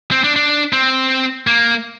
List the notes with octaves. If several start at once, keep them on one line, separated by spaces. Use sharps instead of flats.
C4
D4
D4
C4
A#3